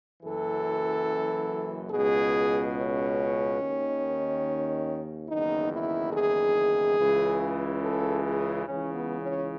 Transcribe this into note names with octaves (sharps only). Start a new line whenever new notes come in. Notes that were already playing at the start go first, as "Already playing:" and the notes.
F#1 F#2 E3 A4
C#2 B2 G#4
C#4
D#2 D#3
F#1 E2 D#3 D#4
E4
G#4
C#2 C#3 E3
A4
G#4
C#2 C#3 E3 C#4
B3
C#4